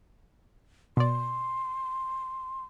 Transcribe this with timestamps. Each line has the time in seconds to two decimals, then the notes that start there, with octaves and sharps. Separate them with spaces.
0.97 B2 D5 C6